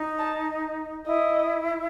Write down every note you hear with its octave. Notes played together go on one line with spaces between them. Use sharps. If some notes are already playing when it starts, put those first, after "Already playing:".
Already playing: D#4
A5
E4 D#5